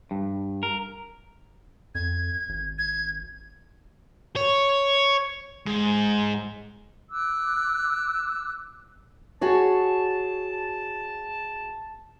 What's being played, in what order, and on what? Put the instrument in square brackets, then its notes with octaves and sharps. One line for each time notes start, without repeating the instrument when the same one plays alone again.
[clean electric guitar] G2
A#4
[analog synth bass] F2 [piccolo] G#6
[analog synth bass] G#1
[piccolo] G#6
[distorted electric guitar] C#5
G#2
[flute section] D6 E6 F#6
[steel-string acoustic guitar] F#4 G#4 C#5 [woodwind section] A5